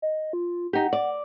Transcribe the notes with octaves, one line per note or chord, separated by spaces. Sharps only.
D#5
F4
D#4 G4 F#5
D5